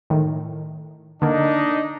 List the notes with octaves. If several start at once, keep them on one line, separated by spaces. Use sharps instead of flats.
A2 D#3
D3 A#3 D4 D#4 D#5